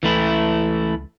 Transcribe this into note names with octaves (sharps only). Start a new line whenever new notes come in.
C#2 E3 A3 E4